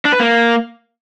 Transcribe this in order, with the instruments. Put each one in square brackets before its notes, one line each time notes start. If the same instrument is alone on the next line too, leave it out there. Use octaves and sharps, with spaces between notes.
[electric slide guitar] D4
B4
A#3